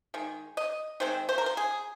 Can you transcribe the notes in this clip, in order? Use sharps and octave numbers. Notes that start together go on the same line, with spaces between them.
D#3 G#3
D#5
D#3 G#3 C4 C5
C5
A#4
C5
G#4